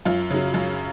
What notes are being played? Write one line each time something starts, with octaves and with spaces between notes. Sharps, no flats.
F#2 F4
C#3 F#3
F#2